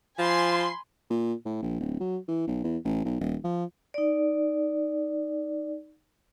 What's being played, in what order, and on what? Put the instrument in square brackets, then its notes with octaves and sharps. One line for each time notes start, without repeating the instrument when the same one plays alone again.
[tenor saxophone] F3 [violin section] G#5 B5 C6
[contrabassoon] A#2
A2
A#1
D1
F#3
E3
B1
E2
A1
B1
D#1
F3
[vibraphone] D#4 D5